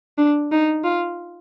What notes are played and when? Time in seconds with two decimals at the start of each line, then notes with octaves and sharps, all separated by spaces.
0.18 D4
0.52 D#4
0.84 F4